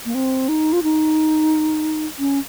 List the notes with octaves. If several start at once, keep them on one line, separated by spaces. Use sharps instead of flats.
A#3
C4
D#4
F4
D#4
C#4